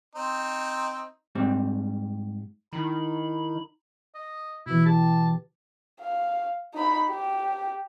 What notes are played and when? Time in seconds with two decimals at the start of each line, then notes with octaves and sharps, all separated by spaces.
0.15 C4 D#4
1.35 G#2 G3 C4
2.73 D#3 D#4 E4 B5
4.15 D#5
4.66 B2 E3 E4
4.86 G4 A5
6.00 F5
6.74 D#4 B5
7.10 G4